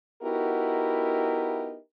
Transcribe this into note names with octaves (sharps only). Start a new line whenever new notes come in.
B3 D#4 E4 F#4 G4 A#4